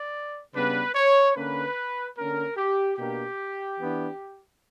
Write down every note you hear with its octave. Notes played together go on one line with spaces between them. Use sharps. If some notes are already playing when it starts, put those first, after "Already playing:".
Already playing: D5
C#3 G3 B3 D4 B4
C#5
D3 A#3 C#4 B4
D3 A#3 C#4 A#4
G4
B2 A#3 D4 G4
E3 B3 D4